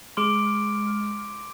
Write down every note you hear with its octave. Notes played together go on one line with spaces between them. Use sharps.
G#3 C6 D6 F6 D7